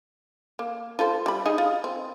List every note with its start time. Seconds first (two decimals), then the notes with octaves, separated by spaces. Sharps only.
0.59 A#3
0.99 F4 A4 C5
1.26 G3 B5
1.46 D#4 G#4 D#5
1.58 F4
1.84 C4